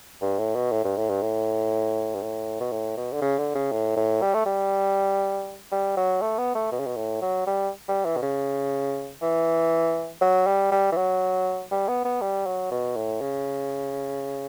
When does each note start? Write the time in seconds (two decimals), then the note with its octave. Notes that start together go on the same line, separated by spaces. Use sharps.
0.22 G2
0.39 A2
0.55 B2
0.72 A2
0.84 G2
0.97 A2
1.09 G2
1.22 A2
2.14 G2
2.22 A2
2.60 B2
2.72 A2
2.97 B2
3.12 D3
3.22 C#3
3.38 D3
3.55 C#3
3.72 A2
3.96 A2
4.22 G3
4.34 A3
4.46 G3
5.71 G3
5.97 F#3
6.21 A3
6.38 B3
6.55 A3
6.72 B2
6.79 C#3
6.86 B2
6.97 A2
7.22 F#3
7.47 G3
7.88 G3
8.05 E3
8.17 B2
8.22 C#3
9.22 E3
10.21 F#3
10.47 G3
10.71 G3
10.92 E3
10.96 F#3
11.71 G3
11.88 B3
12.05 B3
12.21 G3
12.46 F#3
12.71 B2
12.97 A2
13.21 C#3